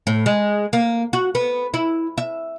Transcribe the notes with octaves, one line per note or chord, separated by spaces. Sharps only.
A2
G#3
A#3
F#4
B3
E4
E5